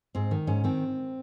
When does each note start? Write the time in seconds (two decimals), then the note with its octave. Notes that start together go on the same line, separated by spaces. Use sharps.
0.15 G#2 C4
0.31 D#3
0.47 G#2 C#4
0.64 D#3 C4